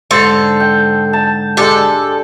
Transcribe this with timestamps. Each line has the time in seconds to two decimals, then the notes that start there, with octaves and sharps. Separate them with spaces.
0.11 G#2 D3 A4 C5
0.60 G5
1.13 A5
1.57 G#3 D4 G4 A4